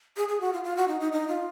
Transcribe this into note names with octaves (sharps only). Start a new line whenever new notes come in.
G#4
G#4
F#4
F4
F4
F#4
D#4
D#4
D#4
F4